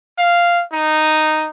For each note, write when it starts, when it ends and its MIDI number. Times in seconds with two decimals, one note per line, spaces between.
0.18 0.63 77
0.73 1.48 63